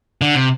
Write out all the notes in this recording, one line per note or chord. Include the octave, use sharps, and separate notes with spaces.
D3
C3